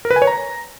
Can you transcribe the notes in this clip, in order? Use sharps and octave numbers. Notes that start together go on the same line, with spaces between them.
A#4
B4
G#5
C#5
A#5